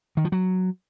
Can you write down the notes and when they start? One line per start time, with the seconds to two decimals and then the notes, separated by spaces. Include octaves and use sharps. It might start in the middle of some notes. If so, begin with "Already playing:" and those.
0.17 D#3
0.25 F3
0.32 F#3